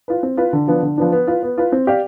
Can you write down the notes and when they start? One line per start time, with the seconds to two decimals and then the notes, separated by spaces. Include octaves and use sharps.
0.08 F4 B4
0.23 C4
0.37 F4 B4
0.53 D3
0.68 F3 B3 D4
0.83 D3
0.97 F3 B3 D4
1.12 B3
1.27 F4 B4
1.43 B3
1.58 F4 B4
1.72 C4
1.87 G4 D5 F5